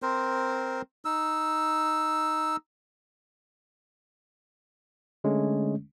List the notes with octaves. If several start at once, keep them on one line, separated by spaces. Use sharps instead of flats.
C4 A#4 C5
D#4 E6
D3 G#3 A3 C#4